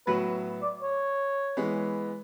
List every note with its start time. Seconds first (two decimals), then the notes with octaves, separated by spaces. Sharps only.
0.07 A2 F#3 B3 F#4 B4
0.62 D5
0.82 C#5
1.57 E3 G#3 B3